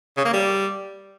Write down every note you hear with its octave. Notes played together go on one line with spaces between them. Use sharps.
C#3
A#3
G3